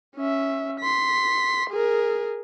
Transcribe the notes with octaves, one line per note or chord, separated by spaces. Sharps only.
C#4 E5
C6 B6
G#4 A#4